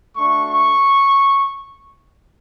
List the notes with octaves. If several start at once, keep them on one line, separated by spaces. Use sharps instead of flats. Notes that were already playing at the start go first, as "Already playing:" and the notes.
A3 D4 F#4 C#6
C#6